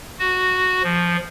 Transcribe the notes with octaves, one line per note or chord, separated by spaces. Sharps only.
F#4
F3